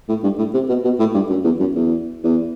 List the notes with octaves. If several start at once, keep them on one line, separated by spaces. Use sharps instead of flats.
A2
G2
A2
C3
B2
B2
A2
G2
F#2
E2
F#2
E2
E2